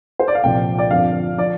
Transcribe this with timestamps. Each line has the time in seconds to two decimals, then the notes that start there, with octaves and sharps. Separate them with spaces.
0.19 C5
0.28 D5
0.35 F5
0.44 C2 A#2 F3 G5
0.78 D5
0.91 G1 F2 F3 F5
1.38 F3 D5